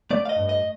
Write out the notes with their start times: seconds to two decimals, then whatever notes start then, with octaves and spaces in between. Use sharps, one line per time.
0.11 A3 D5
0.25 F5
0.29 D#5
0.36 G2
0.49 D#5